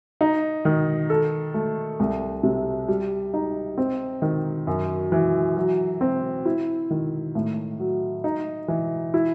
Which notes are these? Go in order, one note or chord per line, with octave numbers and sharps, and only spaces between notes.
D#4
D#3
A4
A3
C2
C3
G3
D#4
C4
D#3
F#2
E3
F#3
C4
E4
D#3
A2
F#3
D#4
E3
E4